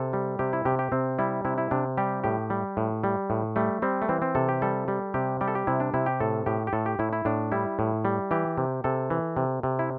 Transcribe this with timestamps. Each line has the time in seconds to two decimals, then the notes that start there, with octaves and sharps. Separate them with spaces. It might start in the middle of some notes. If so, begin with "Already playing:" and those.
Already playing: C3 A4
0.13 G3
0.39 C3 G4
0.53 E4
0.65 C3 G4
0.79 G4
0.92 C3 C4
1.19 G3 E4
1.45 C3 E4
1.58 E4
1.71 C3 D4
1.98 G3 G4
2.24 A2 G4
2.50 G3
2.77 A2
3.04 G3
3.30 A2
3.56 G3 A3
3.82 G3 C4
4.02 A3
4.09 E3 C4
4.22 C4
4.35 C3 A4
4.49 G4
4.62 G3 A4
4.88 G3
5.14 C3 G4
5.41 G3 G4
5.48 A4
5.55 G4
5.67 C3 E4
5.80 D4
5.94 C3 E4
6.06 G4
6.20 A2 A4
6.46 A2 G4
6.67 G4
6.73 A2 A4
6.86 G4
6.99 A2 E4
7.13 E4
7.25 A2 D4
7.52 G3 E4
7.79 A2
8.05 G3
8.31 E3 G4
8.58 C3
8.84 C3 A4
9.10 E3
9.37 C3
9.63 C3
9.79 E4